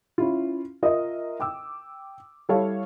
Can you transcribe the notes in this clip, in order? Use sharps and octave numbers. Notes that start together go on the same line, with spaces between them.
C#4 E4 F4
F4 A#4 D#5 E5 D#6
G5 D6 E6
G3 E4 A4 C#5 F5